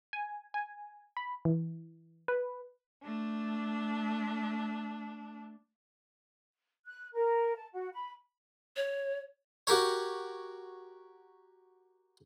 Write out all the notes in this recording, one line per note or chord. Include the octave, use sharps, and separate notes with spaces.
G#5
G#5
B5
E3
B4
A3 D4
F#6
A#4
A5
F#4
B5
C#5
F#4 G4 A#4 C#5